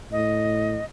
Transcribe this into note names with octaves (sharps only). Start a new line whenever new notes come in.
A2 D#5